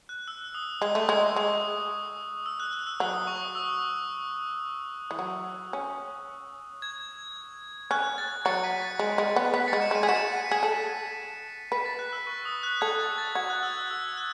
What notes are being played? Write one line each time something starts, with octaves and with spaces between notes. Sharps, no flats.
F#6
E6
D#6
G#3 D#6
A3 C#6
G#3 D#6
D#6
G#3 D#6
E6
F#6
F#6
E6
F#3 D#6
D#6
C#6
D#6
E6
E3
F#3
C#4
G#6
C#4 F#6
A6
F#3 A6 C#7
B6 D#7
A6 C#7
G#3
G#3
B3
B3 B6
A6 C#7
G#3
C#7 E7
G#3 B6 D#7
G#4
F#4 C#7 E7
B6 D#7
G#4
A4 B6
B4 B6
A6
F#6
E6
C#6
D#6
F#6
A4 G#6
A6
A6
F#4 G#6
F#6
E6
E6
E6
F#6